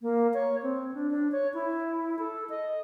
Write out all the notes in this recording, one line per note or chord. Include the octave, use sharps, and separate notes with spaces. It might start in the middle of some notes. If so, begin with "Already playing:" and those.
A#3
C#5
C4
D4
D4
C#5
E4
A4
D#5